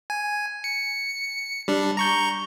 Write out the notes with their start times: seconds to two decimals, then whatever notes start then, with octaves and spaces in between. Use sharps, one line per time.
0.10 G#5
0.64 C#7
1.68 G3 D4
1.97 A#5 C#6 G6